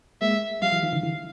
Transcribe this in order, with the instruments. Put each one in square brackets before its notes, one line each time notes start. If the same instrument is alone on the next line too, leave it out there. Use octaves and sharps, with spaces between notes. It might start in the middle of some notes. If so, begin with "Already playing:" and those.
[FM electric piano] G#3 A#3 [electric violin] E5
[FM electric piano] F3 G3 [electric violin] F5
[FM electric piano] E3 F#3
D#3 F3
D3 E3
D3 E3